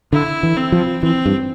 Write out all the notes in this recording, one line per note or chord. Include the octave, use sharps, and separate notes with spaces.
D3 E4
E3
C4
F3
E3 C4
G2